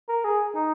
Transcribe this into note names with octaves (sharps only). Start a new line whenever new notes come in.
A#4
G#4
D#4